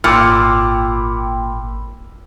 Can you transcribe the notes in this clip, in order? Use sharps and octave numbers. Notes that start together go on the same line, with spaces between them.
G#1 A#2 G5 B5 D6 E6 F6